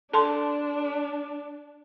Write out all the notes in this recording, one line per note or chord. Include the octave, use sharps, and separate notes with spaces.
D4 A4 A5 C6